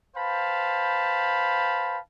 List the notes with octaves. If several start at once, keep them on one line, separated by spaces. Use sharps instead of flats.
B4 C5 F5 G5 A5 B5